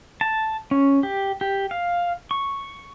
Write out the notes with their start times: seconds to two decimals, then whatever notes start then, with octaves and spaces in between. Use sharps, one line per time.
0.21 A5
0.71 C#4
1.03 G4
1.41 G4
1.71 F5
2.31 C#6